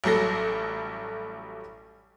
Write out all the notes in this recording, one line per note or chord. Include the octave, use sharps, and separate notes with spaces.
A1 F#3 G3 A4 A#6